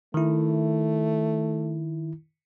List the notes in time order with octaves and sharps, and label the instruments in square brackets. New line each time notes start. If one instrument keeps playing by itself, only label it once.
[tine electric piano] D#3 E4 [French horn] A3